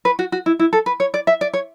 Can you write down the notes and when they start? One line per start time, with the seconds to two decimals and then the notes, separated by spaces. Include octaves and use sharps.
0.05 B4
0.19 F#4
0.32 F#4
0.46 E4
0.59 E4
0.73 A4
0.86 B4
1.00 C#5
1.14 D5
1.27 E5
1.41 D5
1.54 C#5